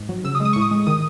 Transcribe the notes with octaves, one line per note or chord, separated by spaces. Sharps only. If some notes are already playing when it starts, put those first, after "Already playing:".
Already playing: G#2
F#3
C#3 E6
D#6
G#3
D#6
A2 C#6
D#6
G#3
D#3 D#6